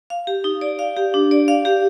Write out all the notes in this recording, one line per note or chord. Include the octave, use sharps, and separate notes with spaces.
F5
G4
D#4
D5
F5
G4
D4
D5
F5
G4